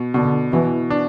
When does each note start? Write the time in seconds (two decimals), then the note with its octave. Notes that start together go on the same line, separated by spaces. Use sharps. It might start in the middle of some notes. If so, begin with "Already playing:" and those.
Already playing: B2
0.14 B2 D3
0.52 B2 E3
0.90 D4